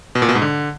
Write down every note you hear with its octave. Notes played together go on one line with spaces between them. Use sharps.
B2
A#2
B2
G#2
D3